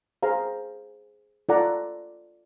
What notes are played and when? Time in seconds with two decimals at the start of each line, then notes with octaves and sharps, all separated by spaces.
0.23 G#4 C5 F5 A#5
1.49 F4 A4 D5 F#5 A#5